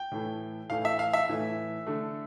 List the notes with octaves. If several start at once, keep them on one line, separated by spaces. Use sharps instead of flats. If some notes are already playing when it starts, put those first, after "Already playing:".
Already playing: G5
A2 E3 A3
A2 E3 A3 F5
E5
F5
E5
A2 E3 A3
D3 A3